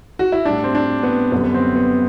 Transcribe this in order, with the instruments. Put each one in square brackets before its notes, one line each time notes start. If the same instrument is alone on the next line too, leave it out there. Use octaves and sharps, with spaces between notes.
[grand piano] F#4
E4
A2 G3 D4
C4
D4
B3
F#2 D3 G3 B3
B3
C4
B3